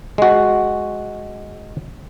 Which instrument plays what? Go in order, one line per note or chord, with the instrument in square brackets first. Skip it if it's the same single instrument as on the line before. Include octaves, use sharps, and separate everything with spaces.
[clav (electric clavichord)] G#3 F#4